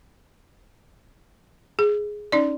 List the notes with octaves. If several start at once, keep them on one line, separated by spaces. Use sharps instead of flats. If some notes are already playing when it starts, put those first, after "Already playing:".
G#4
C#4 D#4 D5